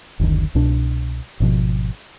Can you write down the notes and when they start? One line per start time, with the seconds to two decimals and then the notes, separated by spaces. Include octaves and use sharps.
0.20 F#1 D2 D#3
0.55 C2 B2 D4
1.40 G#1 B2 F3